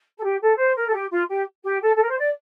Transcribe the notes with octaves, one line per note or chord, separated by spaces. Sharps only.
A4
G4
A4
C5
A#4
A4
G4
F4
G4
G4
A4
A4
A#4
C5
D5